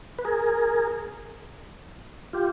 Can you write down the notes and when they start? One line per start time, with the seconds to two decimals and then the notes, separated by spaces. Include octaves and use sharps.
0.19 B4
0.25 G#4 A#4
2.33 F4 G4